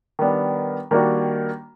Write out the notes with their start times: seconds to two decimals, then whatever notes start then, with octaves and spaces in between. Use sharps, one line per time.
0.19 D#3 G3 B3 D4
0.91 D#3 G3 A#3 D4 F#4